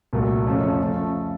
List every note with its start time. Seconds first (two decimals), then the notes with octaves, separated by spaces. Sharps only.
0.13 C2 A#2 F#3 A3
0.47 F2 C#3 F3 A3 C#4
0.80 C#3 F3 A3